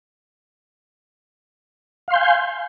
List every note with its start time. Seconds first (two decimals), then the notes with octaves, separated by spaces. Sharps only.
2.08 F5
2.11 C6
2.13 G6
2.16 G#5